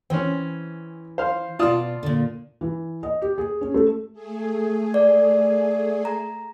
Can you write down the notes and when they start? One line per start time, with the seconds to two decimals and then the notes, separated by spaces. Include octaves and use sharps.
0.10 E3 C4 C#4
1.18 C5 F5
1.59 B2 F4 D5 A5 D#6
2.03 A#2 D3
2.61 E3
3.03 D#5
3.22 G4
3.38 G#4
3.61 C#4
3.74 A3
4.13 A3 G#4
4.94 D5
6.05 A#5